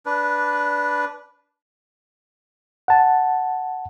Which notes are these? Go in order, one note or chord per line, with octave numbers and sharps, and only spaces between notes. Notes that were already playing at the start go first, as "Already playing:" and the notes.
D4 B4
F#5 A5